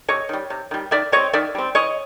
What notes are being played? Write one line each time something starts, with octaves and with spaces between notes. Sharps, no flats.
C3 C#5 D#5
D#3 G3
C3
D#3 G3
D#3 D5 E5
G3 C4 C#5 D#5
D#3 D5 E5
G3 C4
E3 C#5 D#5